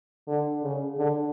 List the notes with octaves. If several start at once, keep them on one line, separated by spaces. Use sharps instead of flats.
D3
C#3
D3